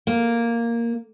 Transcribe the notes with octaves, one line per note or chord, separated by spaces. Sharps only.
A#3